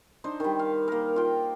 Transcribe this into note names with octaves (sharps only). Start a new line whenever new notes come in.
D4 D#4 C5
D#3 G3
F5
A#3 A#4
F4 G5